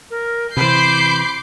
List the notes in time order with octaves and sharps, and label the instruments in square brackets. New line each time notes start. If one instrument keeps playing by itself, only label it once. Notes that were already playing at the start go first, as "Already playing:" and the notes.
[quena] A#4
[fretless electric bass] C3 E3 [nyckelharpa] C5 [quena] B5 [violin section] D6 G6 C7